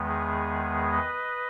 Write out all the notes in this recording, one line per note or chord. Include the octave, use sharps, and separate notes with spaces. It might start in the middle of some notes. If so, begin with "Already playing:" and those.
Already playing: E2 D#3 G#3 B3
G#4
B4 D#5